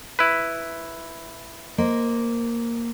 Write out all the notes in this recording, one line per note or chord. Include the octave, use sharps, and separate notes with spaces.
E4 B4
A#3 C5 D#5